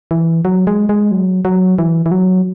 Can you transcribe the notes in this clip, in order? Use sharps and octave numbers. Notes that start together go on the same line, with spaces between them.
E3
F#3
G#3
G#3
F#3
F#3
E3
E3
F#3